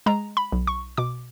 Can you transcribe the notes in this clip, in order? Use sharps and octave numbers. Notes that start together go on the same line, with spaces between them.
G#3 A#5
B5
B1
C#6
B2 D6